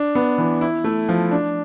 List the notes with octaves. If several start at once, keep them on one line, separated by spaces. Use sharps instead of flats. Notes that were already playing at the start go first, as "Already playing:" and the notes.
Already playing: D4
B3
E3
E4
A3
F3
D4